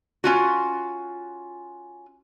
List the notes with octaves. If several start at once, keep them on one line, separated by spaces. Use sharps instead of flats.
C#4 F4 F#4